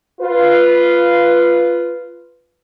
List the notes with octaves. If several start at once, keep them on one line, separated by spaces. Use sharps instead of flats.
F4 B4